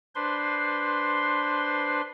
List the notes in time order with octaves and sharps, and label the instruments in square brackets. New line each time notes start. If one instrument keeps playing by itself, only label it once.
[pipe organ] D4 B4 C5 C6